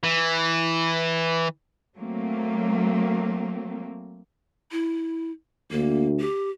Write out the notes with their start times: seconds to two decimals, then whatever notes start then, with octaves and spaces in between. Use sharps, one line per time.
0.03 E3
1.98 F#3 A3 A#3 C4
4.72 E4
5.71 D2 A#3
6.20 G4